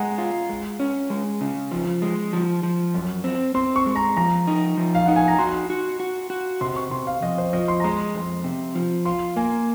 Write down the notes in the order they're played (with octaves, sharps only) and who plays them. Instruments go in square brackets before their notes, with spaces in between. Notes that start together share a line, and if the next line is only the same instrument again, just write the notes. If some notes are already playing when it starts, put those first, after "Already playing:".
Already playing: [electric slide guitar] G#3 [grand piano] F#5 G#5 A#5
[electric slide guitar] F4
G#3
C#4
G#3
C#3
F3
G#3
F3
F3
F#2
C4
[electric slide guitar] C4 [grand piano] C6
[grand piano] C#6
[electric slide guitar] G#3
[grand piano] A#5
[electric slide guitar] F3 [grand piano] A#5
[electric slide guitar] D#4
F3
[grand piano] F5
[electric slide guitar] D#4 [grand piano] F#5
[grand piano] G#5
A#5
[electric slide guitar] F#4 [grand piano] C6
[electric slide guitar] F#4
F#4
F#4
[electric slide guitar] C3 [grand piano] C6
[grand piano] C#6
[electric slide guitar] C3 [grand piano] C6
[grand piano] F5
[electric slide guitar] F2 [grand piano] D#5
[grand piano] C5
[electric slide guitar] F3 [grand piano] D#5
[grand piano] C6
A#5
[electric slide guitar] G#3 [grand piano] C6
[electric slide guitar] F2
C3
F3
[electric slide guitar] F4 [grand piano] C6
[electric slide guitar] A#3 [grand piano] G#5